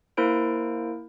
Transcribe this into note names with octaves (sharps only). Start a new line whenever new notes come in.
A#3 E4 A#4 C5 D7